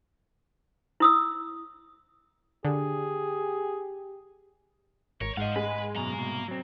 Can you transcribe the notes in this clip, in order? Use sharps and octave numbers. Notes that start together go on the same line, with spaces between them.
E4 D#6 E6
D3 G4 G#4
G#1 A#4 C#5
G#2 C5 D#5 F5 F#5
G#3 B4
F#2 B2 A#3 A#5
C2 B2
F#3 C4